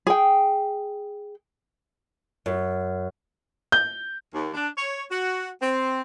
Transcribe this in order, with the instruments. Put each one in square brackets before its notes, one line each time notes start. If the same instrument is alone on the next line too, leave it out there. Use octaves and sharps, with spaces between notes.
[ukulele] G#4 G5
[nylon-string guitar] F#2
[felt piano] G6
[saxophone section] D#2
D4
C#5
F#4
C4